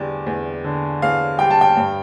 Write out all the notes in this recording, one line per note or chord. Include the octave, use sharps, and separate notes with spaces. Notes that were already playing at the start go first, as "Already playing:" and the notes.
Already playing: E2 D3 G3 D5
E2
D3
E2 F5
G3 G5
A5
G5
G2